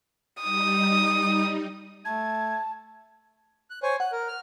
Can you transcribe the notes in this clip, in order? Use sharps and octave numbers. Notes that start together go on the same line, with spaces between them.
G3 D#4 D#6
A3 A5 G#6
F#6
C5 C#5 G#5
F#5 F#6
A#4
F6